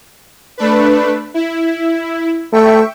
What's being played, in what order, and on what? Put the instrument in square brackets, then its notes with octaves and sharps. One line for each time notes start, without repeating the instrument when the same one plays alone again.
[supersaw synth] A3 D4 B4
E4
[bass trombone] A3 [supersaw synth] E5 G5 C#6